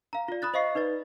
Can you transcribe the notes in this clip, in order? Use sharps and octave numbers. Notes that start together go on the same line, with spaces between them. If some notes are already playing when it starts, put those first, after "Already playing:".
F5 A#5
F4 D5
B5 D#6 F#6 A6
C5 D#5 F5 C#6 C7
D#4 B4 D5 A6